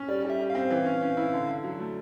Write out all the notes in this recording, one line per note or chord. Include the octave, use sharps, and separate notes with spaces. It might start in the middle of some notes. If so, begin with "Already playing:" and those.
Already playing: C#4
G3 D5
G3
E5
G3
F5
C4
E3
C#4
C#4
E4
D3
D3
F#3
A3